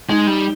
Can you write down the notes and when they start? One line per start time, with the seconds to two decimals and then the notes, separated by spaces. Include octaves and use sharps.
0.09 G#3 D#4
0.27 G3